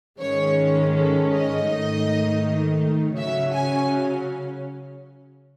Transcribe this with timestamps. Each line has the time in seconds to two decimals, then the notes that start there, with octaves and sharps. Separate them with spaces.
0.20 G#2 D#3 G#3 C#4 C#5
0.94 A4
1.31 D#5
1.68 G#2 D#3 A3 D#4
3.16 C#3 F#3 C#4 E5
3.53 G#5